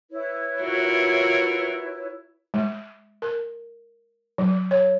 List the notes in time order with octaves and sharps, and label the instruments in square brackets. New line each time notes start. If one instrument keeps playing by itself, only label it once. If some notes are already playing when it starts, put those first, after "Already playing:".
[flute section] E4 B4 C#5
[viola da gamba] F4 F#4 A#4
[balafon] G#3
A#4
F#3
C#5